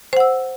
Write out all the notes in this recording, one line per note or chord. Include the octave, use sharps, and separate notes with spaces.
C5 F#5 E6